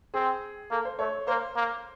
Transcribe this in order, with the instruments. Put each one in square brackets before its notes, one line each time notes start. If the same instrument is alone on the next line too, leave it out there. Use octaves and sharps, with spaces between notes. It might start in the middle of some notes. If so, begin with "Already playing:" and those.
[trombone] C4 [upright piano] G#4
[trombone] A#3 [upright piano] A4
[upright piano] C5
[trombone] A3 [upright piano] C#5
[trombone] A#3 [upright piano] C5
[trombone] A#3